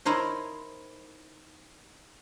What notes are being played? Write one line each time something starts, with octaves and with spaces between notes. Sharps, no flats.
D#4 E4 A#4 C5 C#5